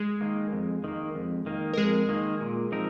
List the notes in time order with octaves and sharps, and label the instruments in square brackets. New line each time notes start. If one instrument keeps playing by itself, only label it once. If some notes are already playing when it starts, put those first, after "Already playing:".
Already playing: [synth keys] G#3 G#4
[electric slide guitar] D#3 A#3
F2
D#3 A#3
F2
D#3 A#3
[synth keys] A#4
[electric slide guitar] F2 [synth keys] G#3 G#4
[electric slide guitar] D#3 A#3
A#2
F3 C4 D#4 A#4